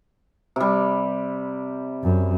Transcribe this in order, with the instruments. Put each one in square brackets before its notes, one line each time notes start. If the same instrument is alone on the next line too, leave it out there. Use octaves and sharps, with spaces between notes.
[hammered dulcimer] C3 G3
[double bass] F#2